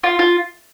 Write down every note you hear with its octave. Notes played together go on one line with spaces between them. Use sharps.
F4
F4